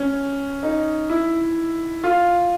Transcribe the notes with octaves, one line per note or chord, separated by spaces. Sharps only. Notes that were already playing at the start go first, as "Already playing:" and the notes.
Already playing: C#4
D#4
E4
F4